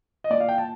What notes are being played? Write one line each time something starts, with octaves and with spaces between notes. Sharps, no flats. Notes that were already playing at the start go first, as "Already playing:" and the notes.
D#5
A#2 D5
F5
G5
A5